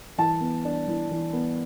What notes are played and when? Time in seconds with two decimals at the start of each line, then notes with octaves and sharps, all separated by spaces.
0.18 E3 A5
0.41 B3
0.65 D4
0.88 E3
1.11 E3
1.33 B3